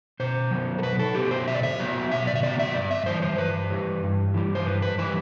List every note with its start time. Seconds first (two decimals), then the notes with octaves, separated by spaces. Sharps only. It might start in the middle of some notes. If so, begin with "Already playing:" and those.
0.20 B2 C5
0.51 F#3 B3
0.78 A4
0.83 B2 B4
0.99 A4
1.15 F#3 B3 G4
1.31 C5
1.47 B2 E5
1.55 D5
1.63 E5
1.79 F#3 B3
2.11 B2 E5
2.27 D5
2.35 E5
2.42 F#3 B3 D5
2.59 E5
2.75 G2 D5
2.91 E5
3.06 E3 G3 C5
3.22 C5
3.38 G2 B4
3.71 E3 G3
4.03 G2
4.34 E3 G3
4.55 C5
4.66 G2 B4
4.82 B4
4.99 E3 G3 B4